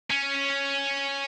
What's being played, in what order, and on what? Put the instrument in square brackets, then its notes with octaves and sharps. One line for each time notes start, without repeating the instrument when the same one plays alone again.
[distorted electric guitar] C#4